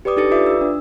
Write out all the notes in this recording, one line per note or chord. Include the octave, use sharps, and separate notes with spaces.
G4 B4 D5 D6 D#6
D4 D#4 G4 A4 A6 C#7
F4 B4 D5 E5 D6 D#6
E6
D4